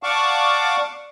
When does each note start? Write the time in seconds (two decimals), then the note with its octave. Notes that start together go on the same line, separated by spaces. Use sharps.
0.03 D5 F5 F#5 A5 C#6 D6